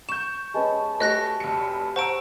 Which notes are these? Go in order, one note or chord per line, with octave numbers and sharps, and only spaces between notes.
C#6 G6 E7
G#3 B3 C#4 A5
A3 F#4 G4 D#5 F#6 A#6
F1 C#7
C5 F#5 A5 A#5 C#6 E6 D7